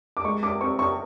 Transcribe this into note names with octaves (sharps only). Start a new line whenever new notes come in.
D6
G#3 C#6
D6
C4 C#6
C#6